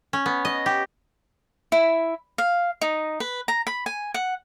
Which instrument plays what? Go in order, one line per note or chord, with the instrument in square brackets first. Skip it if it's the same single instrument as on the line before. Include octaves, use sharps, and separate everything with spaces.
[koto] C#4
B3
D#5
G4
[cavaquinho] E4
F5
D#4
B4
A#5
B5
G#5
F#5